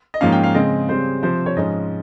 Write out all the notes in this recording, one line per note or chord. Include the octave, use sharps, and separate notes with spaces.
D#5
G#2 F3 A#3 C#4 F5
G5
F5
C#3 G#3 C4 D#5
C#3 G3 C4 C5
C3 F3 C4 C5
C#5
G#2 F3 G#3 C#4 D#5